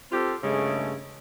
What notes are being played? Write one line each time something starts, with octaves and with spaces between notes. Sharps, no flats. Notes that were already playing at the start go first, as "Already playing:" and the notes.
C4 F4 G4 A4
G2 C#3 G#3 A3